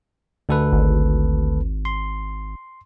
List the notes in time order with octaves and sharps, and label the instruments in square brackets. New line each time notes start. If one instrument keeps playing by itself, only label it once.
[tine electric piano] D2 A4 B4
[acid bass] G#1
[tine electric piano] C6